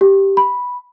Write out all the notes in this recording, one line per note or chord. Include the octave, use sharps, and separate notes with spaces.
G4
B5